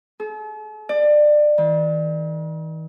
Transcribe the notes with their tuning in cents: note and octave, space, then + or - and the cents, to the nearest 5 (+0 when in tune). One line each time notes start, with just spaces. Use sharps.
A4 -45
D5 +25
D#3 +45